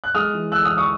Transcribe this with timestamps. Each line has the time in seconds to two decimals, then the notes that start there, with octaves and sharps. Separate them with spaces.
0.04 F#6
0.14 G#3 D#6 F6
0.34 E3
0.52 D2 E6 F#6
0.65 D#6 F6
0.72 E3
0.77 C#6 D#6